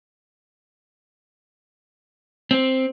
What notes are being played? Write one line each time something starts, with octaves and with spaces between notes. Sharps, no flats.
C4